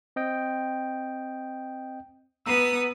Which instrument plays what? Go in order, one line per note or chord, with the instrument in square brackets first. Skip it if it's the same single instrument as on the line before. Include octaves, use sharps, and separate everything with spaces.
[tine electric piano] C4 D#5 G5
[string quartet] B3 B4 D#6 [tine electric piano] A#5 E6